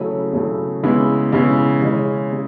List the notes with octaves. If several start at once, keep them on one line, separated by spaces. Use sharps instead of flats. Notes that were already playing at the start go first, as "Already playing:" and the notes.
Already playing: C#3 F#3 A3 C#4 E4
C#3 F#3 A3 C#4 E4
C#3 G#3 B3 E4
C#3 G#3 B3 E4
C#3 G#3 C#4 E4
C#3